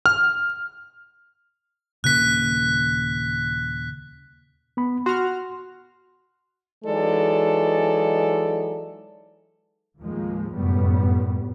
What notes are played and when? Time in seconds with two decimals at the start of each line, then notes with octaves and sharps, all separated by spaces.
0.06 F6
2.04 D#1 C#3 A#3 F#6 B6
4.77 B3 B5
5.06 F#4 C6 F6
6.85 E3 F#3 G#3 D#4 A4 D5
10.01 D#2 A2 F3 G#3 A#3
10.55 F1 F#2 A2 G3 B3